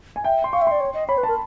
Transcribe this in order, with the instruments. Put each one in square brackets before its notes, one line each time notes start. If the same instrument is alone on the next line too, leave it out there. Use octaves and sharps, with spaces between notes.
[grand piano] G#5
[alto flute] E5 [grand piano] G5
[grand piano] C6
[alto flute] F5 [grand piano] C#6
[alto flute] E5
[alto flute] D5 [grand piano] C6
[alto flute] C#5
D#5
[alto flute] C#5 [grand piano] B5
[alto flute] B4
[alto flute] A#4 [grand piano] A5